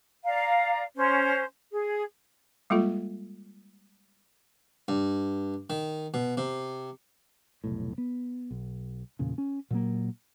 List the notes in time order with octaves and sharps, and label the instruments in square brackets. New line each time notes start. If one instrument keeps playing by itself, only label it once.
[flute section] D5 F5 A#5
C#4 C5
G#4
[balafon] G3 G#3 A#3 F4 A4
[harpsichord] G2
D#3
B2
C3
[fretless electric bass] F1 B1 A2
B3
B1
E2 A#2 C#3
C#4
A#2 F#3 A#3